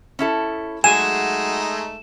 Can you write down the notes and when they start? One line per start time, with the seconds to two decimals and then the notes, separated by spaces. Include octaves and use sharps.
0.19 C#4 E4 A4
0.84 F#3 G#3 A3 D#4 F#4 G#4 G#5 E7